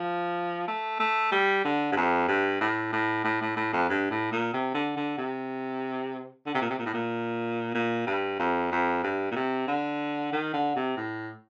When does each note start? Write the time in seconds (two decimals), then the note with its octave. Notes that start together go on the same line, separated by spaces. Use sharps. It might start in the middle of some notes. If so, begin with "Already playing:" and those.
Already playing: F3
0.68 A3
1.00 A3
1.32 G3
1.64 D3
1.92 G2
1.96 F2
2.28 G2
2.61 A2
2.92 A2
3.24 A2
3.41 A2
3.57 A2
3.73 F2
3.89 G2
4.10 A2
4.32 A#2
4.53 C3
4.74 D3
4.97 D3
5.18 C3
6.46 D3
6.54 C3
6.61 A#2
6.70 C3
6.78 A#2
6.86 A2
6.94 A#2
7.75 A#2
8.07 G2
8.39 F2
8.71 F2
9.03 G2
9.31 A#2
9.35 C3
9.68 D3
10.32 D#3
10.53 D3
10.75 C3
10.97 A2